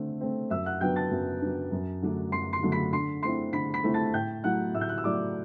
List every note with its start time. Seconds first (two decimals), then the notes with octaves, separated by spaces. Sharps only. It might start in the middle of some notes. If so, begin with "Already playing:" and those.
Already playing: D3 A3 C4
0.21 A3 C4
0.50 F#2 E5 E6
0.65 F#5 F#6
0.81 F#3 B3 D4 G5 G6
0.96 A5 A6
1.11 F#2
1.41 F#3 B3 D4
1.72 F#2
2.02 D3 F#3 A3 D4
2.32 F#2 C6 C7
2.53 C6 C7
2.63 D3 F#3 A3 D4
2.72 B5 B6
2.93 D3 C6 C7
3.23 A3 C4 E4 C6 C7
3.53 D3 B5 B6
3.74 B5 B6
3.84 A3 C4 E4
3.94 A5 A6
4.13 A2 G5 G6
4.44 F#3 A3 E4 F#5 F#6
4.74 A2 E5 E6
4.81 G6
4.89 F#6
4.98 E6
5.04 F#3 A3 E4 D5 D6